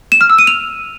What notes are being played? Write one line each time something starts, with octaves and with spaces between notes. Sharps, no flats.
E7
F6
E6
D#7
F7